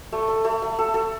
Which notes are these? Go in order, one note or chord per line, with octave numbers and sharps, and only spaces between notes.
A3
A3
A3
A3
A4
A4